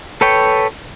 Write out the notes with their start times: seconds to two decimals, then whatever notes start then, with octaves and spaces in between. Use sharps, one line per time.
0.21 A4 B4 C#5 G5